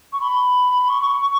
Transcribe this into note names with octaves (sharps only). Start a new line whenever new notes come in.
C#6
B5
C#6